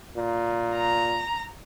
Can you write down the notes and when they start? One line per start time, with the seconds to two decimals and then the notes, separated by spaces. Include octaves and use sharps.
0.17 A#2
0.75 A#5